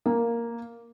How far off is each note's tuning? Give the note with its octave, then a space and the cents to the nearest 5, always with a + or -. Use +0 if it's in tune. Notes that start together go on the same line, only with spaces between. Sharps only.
A#3 +0